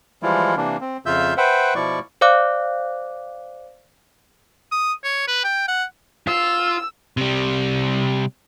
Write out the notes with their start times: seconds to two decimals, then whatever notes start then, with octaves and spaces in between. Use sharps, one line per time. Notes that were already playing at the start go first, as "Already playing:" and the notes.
0.23 E3 F3 G3 G#3 E4 F4
0.57 C3 E3 A#3 D4
0.81 C4
1.06 F2 C#3 F4 E5 E6 G6
1.37 B4 C5 E5 F#5 G5
1.75 B2 F3 E4 D5 C#6
2.21 C5 D5 F5 D6 F#6
4.72 D#6
5.04 C#5
5.27 B4
5.44 G5
5.68 F#5
6.27 F4 E6
7.17 C3 G3